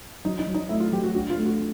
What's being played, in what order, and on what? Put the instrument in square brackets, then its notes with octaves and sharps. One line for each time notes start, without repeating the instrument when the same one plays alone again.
[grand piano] F#3 [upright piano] D#4
[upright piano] D#4
[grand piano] F#3
[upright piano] D#4
[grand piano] A3 [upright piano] E4
[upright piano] F4
[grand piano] F#3 [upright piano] G4
[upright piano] F#4
[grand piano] D4 [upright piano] F#4
[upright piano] F4
[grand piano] A3
[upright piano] F#4